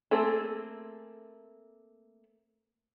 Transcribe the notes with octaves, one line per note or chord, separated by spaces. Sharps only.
A3 A#3 C4 G#4 A4